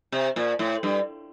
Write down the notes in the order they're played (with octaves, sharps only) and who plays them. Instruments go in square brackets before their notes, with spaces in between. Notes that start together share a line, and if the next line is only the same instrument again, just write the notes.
[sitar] C3
A#2
A2
G2